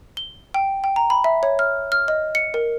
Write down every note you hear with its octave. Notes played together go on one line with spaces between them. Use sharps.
G7
G5
G5
A#5
B5
E5
C#5
F6
F6
D#5
C#7
A#4